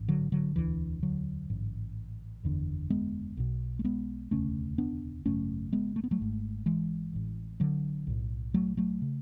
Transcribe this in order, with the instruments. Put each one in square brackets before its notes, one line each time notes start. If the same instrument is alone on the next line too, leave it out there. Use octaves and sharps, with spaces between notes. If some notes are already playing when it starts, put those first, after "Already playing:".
Already playing: [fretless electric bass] A1 G#2
D3 F#3
D3 F#3
E1 D2 D3 E3
D3 F#3
A1 G#2
F#1 E2 D3
G#3 B3
B1 B2
A3
G#3 B3
E1 D2 C#3 A3 C#4
B3 D4
G#1 F#2 C#3 A3 C#4
G#3 B3
A3
B3
F#3 A3
G#1 G#2
E3 G#3
A1 A2
D3 F#3
B1 A2
F#3 A3
F#3 A3
C#3